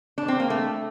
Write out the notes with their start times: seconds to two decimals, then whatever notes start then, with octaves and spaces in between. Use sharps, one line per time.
0.18 D4
0.28 C4
0.40 A#3
0.50 A3